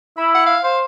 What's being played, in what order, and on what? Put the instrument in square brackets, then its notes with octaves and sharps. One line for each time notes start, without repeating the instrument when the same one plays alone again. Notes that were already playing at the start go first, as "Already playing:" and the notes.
[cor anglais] E4 [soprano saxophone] B5
[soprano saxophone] F#5
F5
[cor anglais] C5 [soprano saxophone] F5